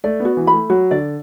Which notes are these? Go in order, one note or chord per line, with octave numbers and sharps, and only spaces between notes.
A3 D5
B3
F#4
E3
B5
A3
F#3 F#4
D3 D5